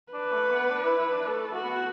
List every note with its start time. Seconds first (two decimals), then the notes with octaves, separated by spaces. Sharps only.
0.13 D4 B4
0.33 A3
0.51 B3
0.70 D4
0.85 E4
0.98 E4
1.13 D4
1.26 A3 A4
1.46 A3
1.55 F#4
1.64 B3